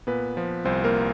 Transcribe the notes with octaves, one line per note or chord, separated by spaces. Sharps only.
A#2 B3 B4
F3
C2 C4 C5
A#3 A#4